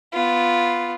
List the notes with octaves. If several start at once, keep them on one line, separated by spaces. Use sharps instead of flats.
B3 F4